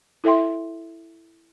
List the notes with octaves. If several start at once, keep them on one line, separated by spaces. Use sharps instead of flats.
E4 A4 E5 G5 C6